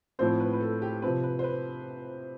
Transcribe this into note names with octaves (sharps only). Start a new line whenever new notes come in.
A2 F3 C4 C5
B4
B4
A4
G4
C3 F3 C4 B4
B4
C5
B4